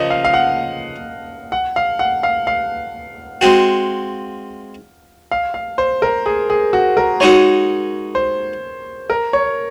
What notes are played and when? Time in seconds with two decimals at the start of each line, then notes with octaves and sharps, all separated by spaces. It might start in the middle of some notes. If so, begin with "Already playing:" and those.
Already playing: C#3 F3 A#3 D#5
0.10 F5
0.25 F5
0.34 F#5
1.52 F#5
1.76 F5
1.99 F#5
2.23 F5
2.47 F5
3.41 G#3 C4 F#4
5.31 F5
5.54 F5
5.78 C5
6.02 A#4
6.26 G#4
6.50 G#4
6.73 F#4
6.97 A#4
7.20 G#3 D#4 F#4 C#5
8.15 C5
9.10 A#4
9.33 C#5